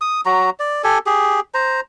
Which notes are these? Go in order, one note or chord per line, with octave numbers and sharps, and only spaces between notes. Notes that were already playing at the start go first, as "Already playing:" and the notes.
D#6
F#3 F#4 A#5
D5
G4 A4 G#5
G4 G#4
C5 A#5